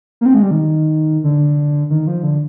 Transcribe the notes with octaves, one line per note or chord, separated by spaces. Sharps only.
A#3
C4
G#3
G3
D#3
D3
D#3
F3
D3